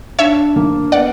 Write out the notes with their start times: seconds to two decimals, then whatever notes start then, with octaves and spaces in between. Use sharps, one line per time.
0.19 D4 C#5 E5
0.56 A#3
0.92 B3 D5 F#5